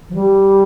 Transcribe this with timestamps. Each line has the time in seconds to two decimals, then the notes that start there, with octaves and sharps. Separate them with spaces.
0.09 F3
0.15 G3